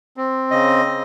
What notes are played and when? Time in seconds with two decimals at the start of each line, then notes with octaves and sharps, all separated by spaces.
0.17 C4
0.51 C#3 D#5
0.86 C4